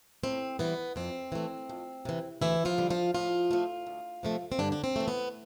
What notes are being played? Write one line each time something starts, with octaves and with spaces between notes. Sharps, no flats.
A2 C4
E3 G3 B3
F2 C4
E3 A3
F2
C3 E3
D2 E3 E4
F3 F4
D3 G3
F3 F4
A2 F3 F4
F3 A3
D2
C3 F3 A3
C4
G2 D3 D4
D4
C4
E3 A3
B3